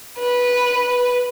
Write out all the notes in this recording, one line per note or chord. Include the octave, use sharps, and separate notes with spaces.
B4